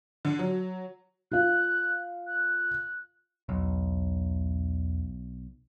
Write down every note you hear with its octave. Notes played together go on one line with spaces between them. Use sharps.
D3
F#3
F4 F5 F#6
F#6
B1 E2